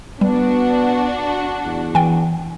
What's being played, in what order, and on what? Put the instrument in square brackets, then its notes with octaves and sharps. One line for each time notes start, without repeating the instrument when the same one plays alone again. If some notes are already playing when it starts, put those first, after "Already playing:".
[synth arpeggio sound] G3 [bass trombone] B3 [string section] D4 F#4
[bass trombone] E2
[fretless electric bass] E3 [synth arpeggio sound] G5 G#5